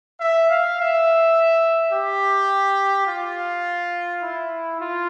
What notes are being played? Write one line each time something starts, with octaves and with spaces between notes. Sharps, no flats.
E5
F5
E5
G4
F4
E4
F4